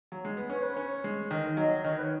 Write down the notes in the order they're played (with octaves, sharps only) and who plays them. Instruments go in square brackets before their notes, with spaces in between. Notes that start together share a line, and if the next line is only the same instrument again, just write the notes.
[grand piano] F#3
G#3
B3
[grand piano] C#4 [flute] C#5
[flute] B4
[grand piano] C#4 [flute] C#5
[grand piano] G#3
[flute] C#5
[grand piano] D#3 [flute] D#5
[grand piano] F#3 [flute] D#5
[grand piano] D#3 [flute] C#5
[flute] B4
C#5